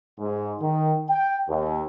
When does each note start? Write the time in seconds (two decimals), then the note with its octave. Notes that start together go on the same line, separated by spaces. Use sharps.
0.19 G#2
0.60 D#3
1.09 G5
1.48 D#2